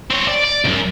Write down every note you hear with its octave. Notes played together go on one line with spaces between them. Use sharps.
C4 C#5
D5
D5
C2 F#2